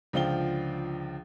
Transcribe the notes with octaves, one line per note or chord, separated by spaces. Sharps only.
C#2 D3 F3 F5 G5 G7